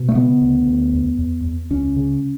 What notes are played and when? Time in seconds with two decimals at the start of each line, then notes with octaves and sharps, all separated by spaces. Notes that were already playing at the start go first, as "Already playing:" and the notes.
Already playing: B2
0.09 A3
0.15 C#3 B3
0.41 D2
0.66 D2
0.93 E2
1.19 E2
1.44 E2
1.70 C#2 C#4
1.96 C#3